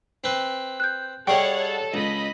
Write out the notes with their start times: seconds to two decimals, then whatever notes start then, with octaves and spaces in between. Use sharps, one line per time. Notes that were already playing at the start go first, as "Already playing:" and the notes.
0.24 C4 B4
0.80 F#6 G6
1.27 G3 G#4 A4 C#5 D#5 F#5 G5 C#6
1.61 A4
1.94 C#2 D#5 B5